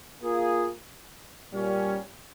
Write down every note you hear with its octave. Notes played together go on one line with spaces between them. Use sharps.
A#3 F4 G#4
A#2 G3 C#4